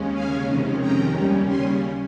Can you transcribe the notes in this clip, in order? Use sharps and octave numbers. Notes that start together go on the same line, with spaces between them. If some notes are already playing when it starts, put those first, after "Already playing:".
Already playing: D#2 C#3 G#3 C#4
F5 G#5
F2 C3 D#3 G#3 C#4
G5 A#5
D#2 C#3 G3 C#4
G#5 C6